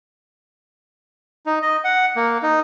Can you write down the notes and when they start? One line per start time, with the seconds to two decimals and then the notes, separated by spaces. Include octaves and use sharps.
1.46 D#4
1.62 D#5
1.84 F#5
2.16 A#3
2.43 D#4